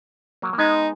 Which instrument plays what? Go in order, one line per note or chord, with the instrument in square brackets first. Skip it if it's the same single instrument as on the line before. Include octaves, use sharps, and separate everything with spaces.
[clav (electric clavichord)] F#3 A#3
A#3
[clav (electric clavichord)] G#3 B3 [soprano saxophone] D#4